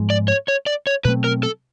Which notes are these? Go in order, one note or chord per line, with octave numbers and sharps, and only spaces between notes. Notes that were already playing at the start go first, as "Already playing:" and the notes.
Already playing: G#2 F3 G#3 B3
D5
C#5
C#5
D5
C#5
B2 F#3 A3 C4 B4
A#4
A4